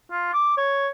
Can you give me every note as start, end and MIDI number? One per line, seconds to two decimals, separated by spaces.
0.11 0.31 65
0.33 0.54 86
0.57 0.88 73